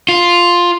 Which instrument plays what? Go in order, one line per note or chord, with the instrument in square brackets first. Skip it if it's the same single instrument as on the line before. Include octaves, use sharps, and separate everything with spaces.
[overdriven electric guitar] F4